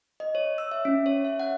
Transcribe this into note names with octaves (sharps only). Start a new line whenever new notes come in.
D#5
C#5
E6
E5
C#4
C#5
E5
F#5